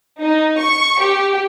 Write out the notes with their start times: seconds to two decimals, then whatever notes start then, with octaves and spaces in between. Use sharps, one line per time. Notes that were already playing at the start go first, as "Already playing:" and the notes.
0.20 D#4
0.60 C#6
1.01 G4